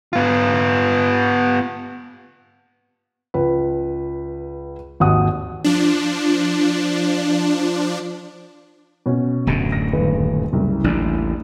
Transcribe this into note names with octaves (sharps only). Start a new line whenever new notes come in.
B3 F4
C#2 B4
G#1 D#2 F#5 D#6
F3 D4
B2 C#4
D1 F#2 D3
A#6
D#1 B4
F#1 C2
A1 D#2 D4